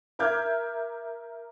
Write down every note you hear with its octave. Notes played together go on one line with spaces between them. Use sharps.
A#4 E5 D6 F6 G6 G#6